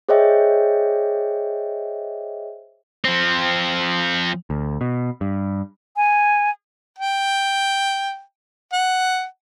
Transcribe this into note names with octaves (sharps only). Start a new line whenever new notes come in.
G#4 C5 C#5 D#5 E5 G5
F3 C4
D2
B2
G2
G#5
G5
F#5